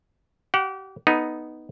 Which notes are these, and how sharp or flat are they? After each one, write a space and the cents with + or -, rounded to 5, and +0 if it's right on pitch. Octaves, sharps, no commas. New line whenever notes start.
G4 -35 F#5 -15
B3 +0 D#4 +0 A4 -15